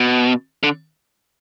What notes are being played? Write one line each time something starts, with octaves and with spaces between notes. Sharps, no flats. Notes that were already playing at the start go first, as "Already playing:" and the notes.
Already playing: B2
D3